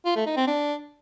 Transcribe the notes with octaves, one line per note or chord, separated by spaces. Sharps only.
F4
A3
D#4
C4
D4